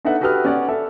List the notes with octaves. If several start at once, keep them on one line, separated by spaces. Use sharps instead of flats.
D4 D#4 A4 B4 E5 F#5
F#4 G4 A4 B4 D#6 F6
C#4 D5 F#5
A4 E5